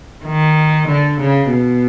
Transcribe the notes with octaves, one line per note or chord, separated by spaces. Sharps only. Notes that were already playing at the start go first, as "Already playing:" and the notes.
D#3
D3
C#3
B2